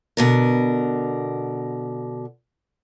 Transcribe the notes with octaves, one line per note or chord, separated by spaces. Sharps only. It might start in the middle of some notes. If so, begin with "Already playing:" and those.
B2 D3 A#4